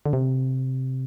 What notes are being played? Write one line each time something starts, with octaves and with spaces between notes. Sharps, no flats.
D3
C3